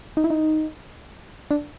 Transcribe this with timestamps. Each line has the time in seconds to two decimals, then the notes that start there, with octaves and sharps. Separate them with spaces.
0.17 D#4
0.24 E4
0.30 D#4
1.51 D4